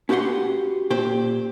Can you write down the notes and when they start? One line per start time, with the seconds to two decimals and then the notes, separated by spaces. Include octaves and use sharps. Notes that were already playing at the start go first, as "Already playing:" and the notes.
0.09 C#4 F#4 G4 B4 F#5 C6
0.90 A#2 G4 C5